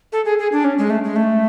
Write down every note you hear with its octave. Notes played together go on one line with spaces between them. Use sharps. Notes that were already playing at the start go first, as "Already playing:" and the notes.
A4
G#4
G#4
D4
C#4
G#3
A3
G#3
A3